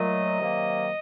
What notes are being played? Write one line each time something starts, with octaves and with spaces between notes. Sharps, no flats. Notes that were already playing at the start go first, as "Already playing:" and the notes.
Already playing: A#2 F#3 A3 D#5
C3 D#3 F#3 A#3